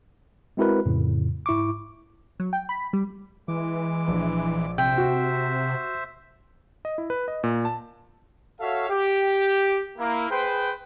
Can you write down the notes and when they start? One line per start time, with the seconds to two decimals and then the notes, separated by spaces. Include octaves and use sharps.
0.57 G#3 C4 E4 F#4 A#4 B4
0.86 F2 A2 C#3
1.46 G#2 E4 C#6 D6
2.40 F#3
2.53 G5
2.69 B5
2.93 G3
3.48 E3 G#3 D6
4.08 A#1
4.78 C3 C5 E5 G5
4.98 F#4
6.85 D#5
6.98 E4
7.10 B4
7.28 D#5
7.44 A#2
7.65 A5
8.60 F#4 A4 C#5 E5 F5
8.90 G4
9.99 A#3 E4
10.31 G#4 B4 C5 G5